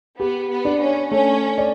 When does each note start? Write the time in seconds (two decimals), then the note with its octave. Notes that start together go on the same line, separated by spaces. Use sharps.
0.19 B3 G4
0.49 B3
0.65 D4
0.81 C#4
1.11 A3 C#4
1.58 D5